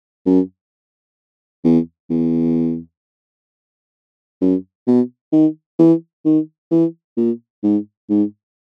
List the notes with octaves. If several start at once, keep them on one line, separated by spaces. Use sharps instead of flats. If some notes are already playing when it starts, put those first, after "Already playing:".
F#2
E2
E2
F#2
B2
D#3
E3
D#3
E3
A#2
G#2
G#2